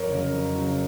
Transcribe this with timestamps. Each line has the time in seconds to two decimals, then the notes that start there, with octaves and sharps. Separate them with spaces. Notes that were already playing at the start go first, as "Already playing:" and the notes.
Already playing: F2 A#4 C#5
0.09 C#3 F#3
0.31 F2
0.55 C#3 F#3